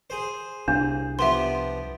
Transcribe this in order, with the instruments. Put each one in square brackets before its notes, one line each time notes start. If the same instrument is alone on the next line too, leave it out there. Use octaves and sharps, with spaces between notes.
[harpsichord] G#4 C5
[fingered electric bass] C2 [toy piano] D4
[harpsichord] F3 B3 G4 [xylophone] E5 C6